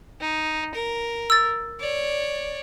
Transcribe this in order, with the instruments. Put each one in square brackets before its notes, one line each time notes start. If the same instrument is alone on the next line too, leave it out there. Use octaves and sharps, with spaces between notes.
[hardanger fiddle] D#4
A#4
[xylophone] E6 A6
[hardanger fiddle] C#5 D5